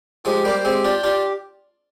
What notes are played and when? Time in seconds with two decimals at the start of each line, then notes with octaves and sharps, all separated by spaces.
0.25 F3 G#3 G4
0.45 G3 A#3 C5
0.65 G#3 C4 G4
0.84 D4 F4 G5
1.03 D4 F4 G4